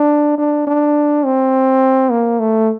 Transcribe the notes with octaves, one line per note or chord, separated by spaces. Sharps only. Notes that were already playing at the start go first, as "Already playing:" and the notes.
Already playing: D4
D4
D4
C4
A#3
A3